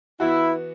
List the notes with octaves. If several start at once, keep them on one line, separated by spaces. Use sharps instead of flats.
E3 B3 E4 F#4